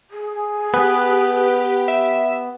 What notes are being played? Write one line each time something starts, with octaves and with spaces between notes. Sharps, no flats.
G#4
B3 G4 B4
E5